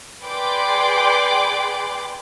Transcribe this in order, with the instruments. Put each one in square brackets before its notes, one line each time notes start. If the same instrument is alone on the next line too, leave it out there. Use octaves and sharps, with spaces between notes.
[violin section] G#4 B4 D5 G5 C6 D6